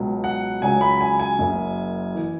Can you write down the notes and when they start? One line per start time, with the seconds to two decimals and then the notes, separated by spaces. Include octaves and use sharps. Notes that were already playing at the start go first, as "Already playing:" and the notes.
Already playing: C#2 B2 F#3
0.24 F#5
0.62 C#2 C#3 F#3 G#5
0.81 B5
1.01 G#5
1.19 G#5
1.39 F#1 F#2 F#3
2.15 E3